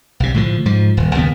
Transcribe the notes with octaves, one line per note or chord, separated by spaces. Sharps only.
B1 C3
A2 D3 F3
G#2 F3
D#1
D#2 C#3 A3 B3